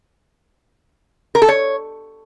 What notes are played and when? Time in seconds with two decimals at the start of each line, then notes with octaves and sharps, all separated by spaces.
1.35 A#4
1.42 A4
1.49 C#5